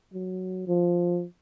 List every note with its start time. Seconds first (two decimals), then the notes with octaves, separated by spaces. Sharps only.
0.14 F#3
0.68 F3